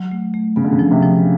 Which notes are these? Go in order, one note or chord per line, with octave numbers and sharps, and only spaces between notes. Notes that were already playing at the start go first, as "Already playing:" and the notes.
Already playing: F#3
A3
A3
C#3 B3
D3
C#3
F3
C3
F3